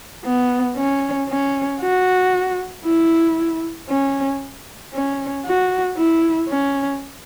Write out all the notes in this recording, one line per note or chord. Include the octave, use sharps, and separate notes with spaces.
B3
C#4
C#4
F#4
E4
C#4
C#4
F#4
E4
C#4